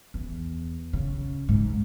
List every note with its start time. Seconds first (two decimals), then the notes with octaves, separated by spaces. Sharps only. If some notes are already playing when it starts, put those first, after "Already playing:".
0.14 E2
0.93 C#3
1.49 G#2